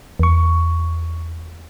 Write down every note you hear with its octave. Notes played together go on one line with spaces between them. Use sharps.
E2 C#6